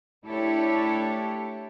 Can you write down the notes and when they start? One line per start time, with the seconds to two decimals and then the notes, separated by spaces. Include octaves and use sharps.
0.25 A3 D4 E4 G4 A4 C#5